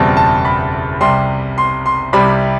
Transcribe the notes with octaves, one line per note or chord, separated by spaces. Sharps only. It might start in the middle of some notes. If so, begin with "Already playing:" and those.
Already playing: F#1 E2 B2 G3 C4 A5
A5
B5
C2 C3 G3 C6
C6
C6
C2 C3 G3 B5